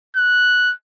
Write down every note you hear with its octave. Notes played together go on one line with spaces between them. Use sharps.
F#6